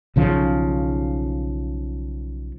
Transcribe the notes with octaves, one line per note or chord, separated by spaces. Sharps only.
B1 C#3 F3